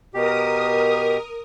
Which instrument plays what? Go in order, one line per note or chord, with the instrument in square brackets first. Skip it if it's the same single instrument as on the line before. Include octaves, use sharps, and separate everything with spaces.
[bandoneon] B2 G4 [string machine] A#4 D#6